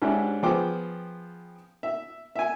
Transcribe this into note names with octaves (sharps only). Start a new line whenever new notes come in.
G#2 C#4 D4 E4 G4
F3 B3 G#4 C5 G5 D6
E5
E5 G#5